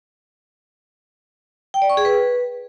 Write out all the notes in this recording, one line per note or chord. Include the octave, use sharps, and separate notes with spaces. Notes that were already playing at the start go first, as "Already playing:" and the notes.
G5
D5
C#6
G#4
B4